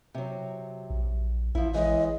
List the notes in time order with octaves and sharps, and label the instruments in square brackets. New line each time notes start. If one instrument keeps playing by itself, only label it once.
[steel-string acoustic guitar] C3 F#3
[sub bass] A#1
[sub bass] A1 [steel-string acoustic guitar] F3 E4
[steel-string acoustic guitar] E3 G#3 C#5 [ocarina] D#5